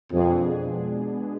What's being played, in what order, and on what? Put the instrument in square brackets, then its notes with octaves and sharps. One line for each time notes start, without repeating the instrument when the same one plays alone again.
[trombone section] F2 [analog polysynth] B2 G#3 B3 D4 G#4